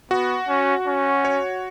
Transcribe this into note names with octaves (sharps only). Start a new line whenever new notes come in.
B3 F#4
C#4
C#4
C#5